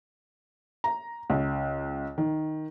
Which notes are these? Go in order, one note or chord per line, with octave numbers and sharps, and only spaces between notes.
A#5
C#2
D#3